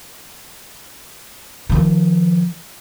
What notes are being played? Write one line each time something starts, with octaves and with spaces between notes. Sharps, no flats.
D#3 F3